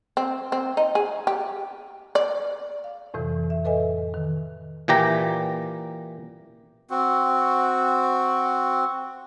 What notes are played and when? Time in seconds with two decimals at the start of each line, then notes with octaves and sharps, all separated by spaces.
0.17 C4
0.52 C4
0.77 D#4
0.95 G#4
1.27 G4
2.15 D5
2.84 F5
3.14 F2 A2 C3 E3
3.50 E5
3.65 A4 B4 D#5 E5 G#5
4.14 D#3
4.88 A#2 E3 G4 A#5
6.90 C4 F#4